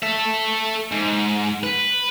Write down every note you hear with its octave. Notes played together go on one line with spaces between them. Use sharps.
A4 E5
G#2
B4